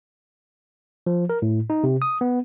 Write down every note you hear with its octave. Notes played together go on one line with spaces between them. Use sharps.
F3
A#4
A2
D#4
C3
D#6
B3